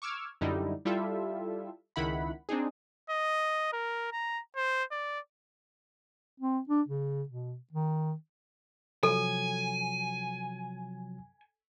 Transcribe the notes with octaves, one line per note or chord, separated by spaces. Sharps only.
C#6 D6 E6 F6 G#6
F#2 D3 G3 D#4 E4
G3 E4 F4 A4 E5
C#2 D#3 E4 F#5 B5
C4 D4 D#4 G#4
D#5
A#4
A#5
C5
D5
C4
D4
C#3
B2
D#3
C3 F3 F#3 A4 G#5